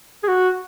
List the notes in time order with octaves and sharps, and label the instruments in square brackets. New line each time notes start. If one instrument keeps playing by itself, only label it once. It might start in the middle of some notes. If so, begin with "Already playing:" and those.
[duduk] G#4
F#4